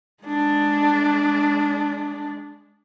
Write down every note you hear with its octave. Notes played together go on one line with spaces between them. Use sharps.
G#3 D4